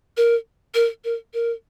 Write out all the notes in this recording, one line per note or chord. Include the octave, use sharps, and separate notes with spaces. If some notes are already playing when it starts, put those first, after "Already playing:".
A#4
A#4
A#4
A#4